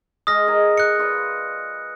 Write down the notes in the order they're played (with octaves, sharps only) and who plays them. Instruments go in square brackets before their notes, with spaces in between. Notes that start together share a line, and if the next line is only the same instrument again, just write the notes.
[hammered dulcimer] G#3 [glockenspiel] D#6 F6 A#6
[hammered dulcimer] G#4 A#4 D#5
[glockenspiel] F#6 C#7
[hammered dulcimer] F4 B4 D5